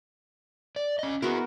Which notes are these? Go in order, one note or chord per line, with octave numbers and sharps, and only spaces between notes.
D5
C#4 D#5
B3 E4 F#4 G#4 A#4